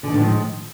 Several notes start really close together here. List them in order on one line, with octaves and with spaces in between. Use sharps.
D3 D#3 A2 F3 G#3